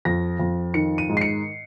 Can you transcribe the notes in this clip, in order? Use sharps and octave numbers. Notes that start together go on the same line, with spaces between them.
F2 A#6
F2
D#3 C#7
D#7
G#2
C7
C#7